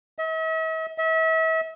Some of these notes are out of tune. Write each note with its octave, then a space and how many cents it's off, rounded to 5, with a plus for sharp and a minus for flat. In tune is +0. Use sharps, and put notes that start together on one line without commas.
E5 -45
E5 -35